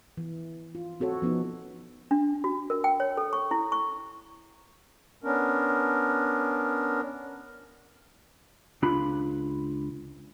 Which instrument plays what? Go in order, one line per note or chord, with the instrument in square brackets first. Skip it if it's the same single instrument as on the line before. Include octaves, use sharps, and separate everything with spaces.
[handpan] E3
F4
C4 F#4 A4 C#5
F3 B3 C#4 D#4
[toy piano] D4
F#4
A#4
G5
C#5
A4
C#6
E4
C#6
[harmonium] B3 C#4 D4 A#4
[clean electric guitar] C#2 D4 F4 B5